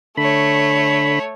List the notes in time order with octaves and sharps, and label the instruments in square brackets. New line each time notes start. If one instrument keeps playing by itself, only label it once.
[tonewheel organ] D3 B5 [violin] A3 C#5